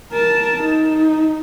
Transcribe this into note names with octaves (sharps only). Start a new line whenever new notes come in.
A#4 A5
D#4